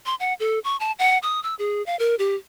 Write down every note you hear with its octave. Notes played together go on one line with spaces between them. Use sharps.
C6
F#5
A4
C#6
A5
F#5
D#6
E6
G#4
F5
A#4
G4